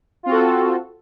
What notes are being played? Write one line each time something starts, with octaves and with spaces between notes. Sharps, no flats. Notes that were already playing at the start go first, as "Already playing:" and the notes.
C4 F4 F#4 A4